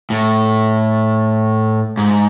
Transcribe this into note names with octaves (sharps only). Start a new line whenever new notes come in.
A2
G#2